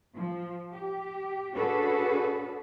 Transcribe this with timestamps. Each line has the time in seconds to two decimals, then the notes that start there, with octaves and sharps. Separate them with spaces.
0.15 F3
0.72 G4
1.54 C#4 D4 F#4 G#4 A4 B4